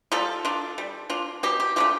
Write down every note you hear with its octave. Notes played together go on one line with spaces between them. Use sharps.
G3 F4 A4
D4 F4
G3
D4 F4
B2 G4
G4
A3 D4 F4 G4